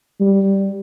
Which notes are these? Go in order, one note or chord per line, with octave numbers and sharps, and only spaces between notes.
G3